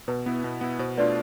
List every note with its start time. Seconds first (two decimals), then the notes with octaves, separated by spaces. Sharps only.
0.08 B2 B4
0.26 B3 E4
0.44 B2
0.61 B3 E4
0.79 B2 C5
0.97 A3 D4 F4 B4 D5